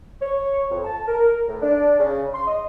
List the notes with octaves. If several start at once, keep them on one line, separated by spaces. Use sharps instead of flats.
C#5
F2
A5
A#4
A2
D4
C#3
C6
D#5